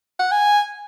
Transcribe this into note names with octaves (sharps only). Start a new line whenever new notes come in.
F#5
G#5